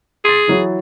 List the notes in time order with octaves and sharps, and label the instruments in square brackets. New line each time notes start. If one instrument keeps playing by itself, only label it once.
[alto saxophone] G#4 [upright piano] C6 A6
[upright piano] E3 F#3 E4